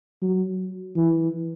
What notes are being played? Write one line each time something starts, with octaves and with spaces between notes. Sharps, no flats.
F#3
E3